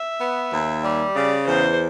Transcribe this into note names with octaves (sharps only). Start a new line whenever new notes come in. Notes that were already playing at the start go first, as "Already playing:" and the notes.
Already playing: E5
B3
D#2
G3
C#3 D5
E2 C5